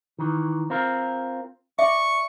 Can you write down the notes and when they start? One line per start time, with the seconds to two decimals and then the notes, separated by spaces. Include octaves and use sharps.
0.19 D#3 E3
0.70 C4 F4 A#4
1.79 D5 E5 C#6